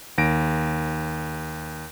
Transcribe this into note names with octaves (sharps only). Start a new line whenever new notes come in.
D#2 A#6 D7